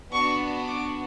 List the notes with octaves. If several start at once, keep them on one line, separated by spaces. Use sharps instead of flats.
B3 D4 F#4 C#6
D6